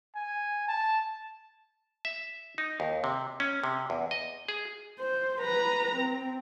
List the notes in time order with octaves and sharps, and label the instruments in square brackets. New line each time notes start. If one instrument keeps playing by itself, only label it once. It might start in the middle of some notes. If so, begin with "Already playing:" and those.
[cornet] G#5
A5
[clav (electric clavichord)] E5
D#4
D#2
C3
C#4
C3
E2
D#5
G#4
[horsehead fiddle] C5
B4 A#5
C4